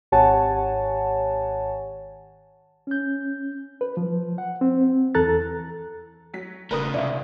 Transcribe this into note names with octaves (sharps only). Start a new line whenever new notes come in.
G#1 G4 C#5 F#5 G#5 A5
C#4 G6
B4
F3
F#5
C4
E2 E3 A4 A#5 F#6 A6
F#3 B6
D#1 C#3 A3 A#4 B4 D#6
C#2 C3 D5 E5 F5